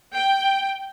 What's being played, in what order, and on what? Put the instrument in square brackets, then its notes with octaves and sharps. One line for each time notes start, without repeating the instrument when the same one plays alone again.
[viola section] G5